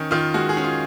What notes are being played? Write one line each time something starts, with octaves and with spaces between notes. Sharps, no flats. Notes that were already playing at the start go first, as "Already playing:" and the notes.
Already playing: D#3 C#4
D#3 F4
G#3 F#4
G#4
C#4
F4